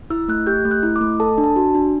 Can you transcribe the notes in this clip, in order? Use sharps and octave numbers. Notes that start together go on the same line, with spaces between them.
E4 E6
A3 F#6
G4 G6
A3
F#6
E4
D6
A3
A4 A5
D4
A5
F#4
D4